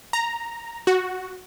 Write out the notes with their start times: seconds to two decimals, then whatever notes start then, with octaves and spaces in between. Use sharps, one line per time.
0.13 A#5
0.87 F#4